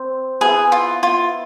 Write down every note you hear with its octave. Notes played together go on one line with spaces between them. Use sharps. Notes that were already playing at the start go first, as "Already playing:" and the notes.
Already playing: C4 C5
B3 E4 G#4 B4 E5
F4
F4